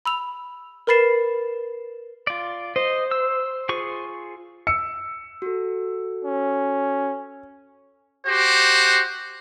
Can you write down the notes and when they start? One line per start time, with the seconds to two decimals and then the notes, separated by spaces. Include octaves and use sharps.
0.05 B5 E6 F7
0.87 A#4 B4 B5 A6 C7 E7
2.27 F4 D5
2.76 C5 D#5
3.11 E6
3.69 F4 G#4 C#6
4.67 E6 C#7
5.42 F#4 A4
6.25 C#4
8.27 F#4 G4 C5